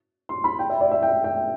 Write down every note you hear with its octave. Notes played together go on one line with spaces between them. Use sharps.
C6
B5
G5
E5
D5
E5
G5
G5